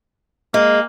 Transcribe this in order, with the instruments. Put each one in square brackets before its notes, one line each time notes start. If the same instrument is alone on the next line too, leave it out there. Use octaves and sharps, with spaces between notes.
[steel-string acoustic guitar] G#3 [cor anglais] A#3